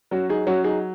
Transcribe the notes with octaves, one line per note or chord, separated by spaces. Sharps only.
F#3 C#4 F#4
D#4 G#4
F#3 C#4 F#4
D#4 G#4